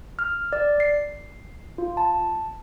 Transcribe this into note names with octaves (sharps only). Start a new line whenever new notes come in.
F6
D5
C7
F4
A5